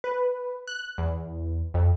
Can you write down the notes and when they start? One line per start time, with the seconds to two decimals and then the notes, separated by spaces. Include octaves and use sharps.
0.04 B4
0.67 F#6
0.98 E2
1.74 F2